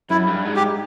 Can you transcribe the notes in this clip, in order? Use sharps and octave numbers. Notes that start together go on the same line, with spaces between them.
F#2 E4
G2
G#2
G4